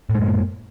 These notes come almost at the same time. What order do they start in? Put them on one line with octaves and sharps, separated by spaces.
A2 G#3 F#2 A#3